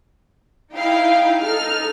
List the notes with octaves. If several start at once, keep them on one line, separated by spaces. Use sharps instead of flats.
D#4 E4 F5 G5
D#4 A4 F6